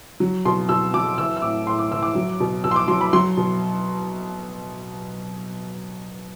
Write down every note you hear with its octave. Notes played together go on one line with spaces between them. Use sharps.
F#3
B2 C6
B2 E6
F#3 D6
E3 E6
E6
A2 D6
A2 C6
D6
E3 E6
D6
F#3
B2
B2 E6
C6
D6
F#3 C6
B5
F#3 C6
B2